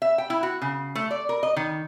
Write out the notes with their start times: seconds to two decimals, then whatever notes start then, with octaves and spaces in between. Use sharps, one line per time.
0.02 E5
0.18 G5
0.30 E4
0.43 F#4
0.62 C#3
0.95 A3
1.11 D5
1.29 A#4
1.43 D#5
1.56 D#3